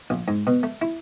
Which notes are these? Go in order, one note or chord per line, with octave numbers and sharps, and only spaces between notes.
A#1
G#2
B2
A3
E4